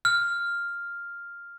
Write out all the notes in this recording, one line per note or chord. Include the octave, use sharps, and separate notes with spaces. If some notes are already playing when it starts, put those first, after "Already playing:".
F6